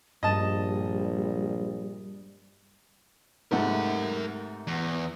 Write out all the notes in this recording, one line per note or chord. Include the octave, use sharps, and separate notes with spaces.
A#1 G2 G3 D#5 A5
G#2 C3 A3 A#4 F#5
E2